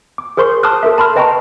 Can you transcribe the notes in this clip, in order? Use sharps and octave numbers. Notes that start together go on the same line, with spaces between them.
D6
G#4 A#4 C5 C6 C#6
A5 C6 D6 D#6 F6 F#6
A4 A#4 E5
A5 B5 C6 F6
B4 D#5 G5 A5 A#5 C#6